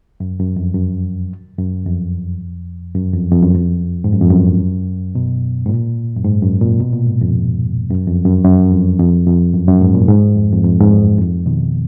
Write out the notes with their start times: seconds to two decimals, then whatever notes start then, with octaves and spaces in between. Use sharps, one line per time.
0.20 F#2
0.39 F#2
0.56 F2
0.75 F#2
1.58 F#2
1.86 F2
2.95 F#2
3.13 F2
3.32 F2
3.43 F#2
3.55 F2
4.04 G#2
4.13 F#2
4.21 F2
4.30 F#2
5.15 B2
5.66 G#2
5.69 A#2
6.16 F#2
6.25 G#2
6.42 F#2
6.61 A#2
6.80 B2
6.93 A#2
7.07 G#2
7.21 F2
7.90 F#2
8.07 F2
8.26 F#2
8.44 F#2
8.72 F2
8.99 F2
9.27 F2
9.54 F#2
9.68 F#2
9.81 G#2
9.95 A#2
10.09 G#2
10.36 F2
10.53 F2
10.65 F2
10.81 G#2
10.91 F#2
11.18 F2
11.46 B2 D#3